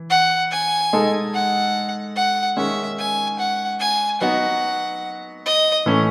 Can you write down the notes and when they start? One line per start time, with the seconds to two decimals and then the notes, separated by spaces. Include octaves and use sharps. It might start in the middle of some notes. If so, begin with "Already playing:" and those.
Already playing: E3
0.10 F#5
0.51 G#5
0.93 G#3 D#4 A4
1.33 F#5
2.16 F#5
2.57 D#3 G#3 C#4 E5
2.99 G#5
3.39 F#5
3.80 G#5
4.21 F#3 B3 D#4 F#4 F#5
5.45 D#5
5.86 A2 E3 A3 C#4